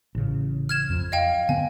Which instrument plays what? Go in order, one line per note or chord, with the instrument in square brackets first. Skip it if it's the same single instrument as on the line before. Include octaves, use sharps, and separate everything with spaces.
[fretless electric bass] A1 C#3
[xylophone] F6 G#6 E7
[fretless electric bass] F2
[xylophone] D#5 F5 G5
[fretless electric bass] D3 B3 C4 [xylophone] G#5